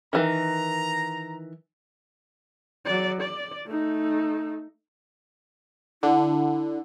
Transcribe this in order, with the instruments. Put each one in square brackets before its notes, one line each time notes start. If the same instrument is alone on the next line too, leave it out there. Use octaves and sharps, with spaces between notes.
[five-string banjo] D#3 E3 [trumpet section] A#5
[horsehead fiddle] F#3 D5
D5
A3 D#4
[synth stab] D3 [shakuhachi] E4